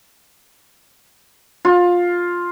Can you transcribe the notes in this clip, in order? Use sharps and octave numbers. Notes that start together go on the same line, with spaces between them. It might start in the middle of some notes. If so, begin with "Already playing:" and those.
F4